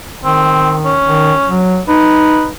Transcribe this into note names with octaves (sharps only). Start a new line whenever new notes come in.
D#3 C4
C#4
D#3
F#3
D#4 B4